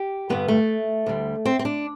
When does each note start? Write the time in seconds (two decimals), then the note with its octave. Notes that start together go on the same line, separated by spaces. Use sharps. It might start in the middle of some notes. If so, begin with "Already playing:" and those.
Already playing: G4
0.30 G2 D3 G3 B3
0.48 A3
1.06 D2 D3 G3
1.45 C4
1.59 C4
1.65 D4